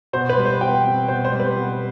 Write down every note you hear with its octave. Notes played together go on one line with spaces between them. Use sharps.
B2 C5
B4
G3
C5
B2 G5
C4
B2 C5
C5
G3
B4
B2